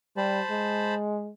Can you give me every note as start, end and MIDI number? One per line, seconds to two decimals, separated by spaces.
0.17 0.40 55
0.17 0.94 72
0.17 0.94 81
0.17 0.94 83
0.51 1.31 56